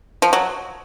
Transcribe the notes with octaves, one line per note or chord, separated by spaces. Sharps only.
F3
F#3